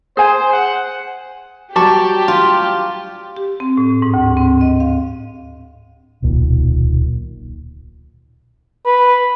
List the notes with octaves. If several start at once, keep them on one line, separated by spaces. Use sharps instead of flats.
G#4 C5 G#5
F#5
F#3 G3 G4 D5 A5 C#6
F4
G4
C4
A2
G#2
D2
C4
D#5
F5
D1 B1 A#2 D#3
B4